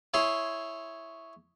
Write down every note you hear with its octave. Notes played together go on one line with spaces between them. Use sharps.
E4 G#4 C#5 C6